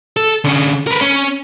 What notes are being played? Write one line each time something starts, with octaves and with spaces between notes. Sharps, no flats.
A4
D3 C#4
A#4 B4
C#4